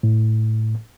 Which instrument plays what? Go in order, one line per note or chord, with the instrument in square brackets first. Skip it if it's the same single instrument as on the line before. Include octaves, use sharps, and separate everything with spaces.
[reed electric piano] A2